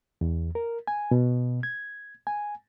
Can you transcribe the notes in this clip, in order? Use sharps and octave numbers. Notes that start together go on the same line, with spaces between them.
E2
A#4
G#5
B2
G#6
G#5